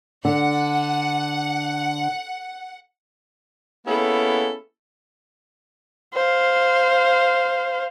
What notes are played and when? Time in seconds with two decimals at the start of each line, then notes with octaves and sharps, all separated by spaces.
0.25 D3 F#5
3.87 A#3 B3 C#4 E4 G#4 A4
6.14 C5 F5